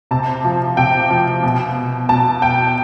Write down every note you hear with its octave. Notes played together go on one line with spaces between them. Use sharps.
C3 A5
F3
C3 G5
F3
B2
B2 A5
G5